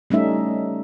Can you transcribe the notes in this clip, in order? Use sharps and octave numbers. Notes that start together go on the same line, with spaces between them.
G3 A3 C#4 D#4 E5